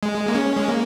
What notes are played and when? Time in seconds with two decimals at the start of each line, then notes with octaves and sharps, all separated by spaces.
0.03 G#3
0.28 A#3
0.35 C#4
0.56 G#3
0.68 A#3